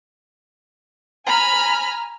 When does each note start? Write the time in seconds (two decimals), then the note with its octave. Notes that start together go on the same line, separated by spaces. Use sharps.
1.26 G#5 A#5 B5 F6